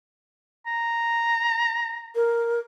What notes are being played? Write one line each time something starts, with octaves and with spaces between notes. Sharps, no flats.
A#5
A#4